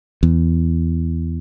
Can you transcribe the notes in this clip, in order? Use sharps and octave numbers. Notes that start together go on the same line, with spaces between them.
E2